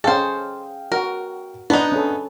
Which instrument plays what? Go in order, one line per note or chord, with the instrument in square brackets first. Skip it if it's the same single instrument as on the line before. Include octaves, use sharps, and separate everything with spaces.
[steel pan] C#4 G#4 [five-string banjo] A4 C5 [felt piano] D#5 F5 G5
[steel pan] F#4 [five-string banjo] A#4
[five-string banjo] B3 D#4 [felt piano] D4 B5
[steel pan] C#4 A4